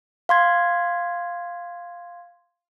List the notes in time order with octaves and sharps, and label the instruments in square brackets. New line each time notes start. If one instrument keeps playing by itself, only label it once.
[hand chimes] F5 C6 G#6